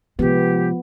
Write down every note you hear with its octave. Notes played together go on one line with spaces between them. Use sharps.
C3 F3 G#3 B3 G4